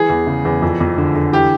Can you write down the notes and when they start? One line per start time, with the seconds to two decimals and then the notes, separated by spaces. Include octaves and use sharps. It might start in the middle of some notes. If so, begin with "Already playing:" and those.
Already playing: E3 G#4
0.10 E2
0.27 C#3
0.45 E2
0.62 F2
0.80 F2
0.98 D3
1.15 D3
1.33 E3 G4